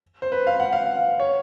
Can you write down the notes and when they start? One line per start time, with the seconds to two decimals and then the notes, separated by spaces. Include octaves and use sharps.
0.22 C5
0.32 B4
0.47 F5
0.60 F#5
0.73 F5
1.20 C#5